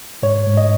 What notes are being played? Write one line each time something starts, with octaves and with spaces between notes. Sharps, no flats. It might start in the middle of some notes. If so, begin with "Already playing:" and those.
G#2 C#5
G#2
D#5